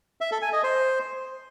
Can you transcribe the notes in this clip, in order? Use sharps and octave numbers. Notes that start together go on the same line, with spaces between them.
E5
A4
G#5
D#5
C5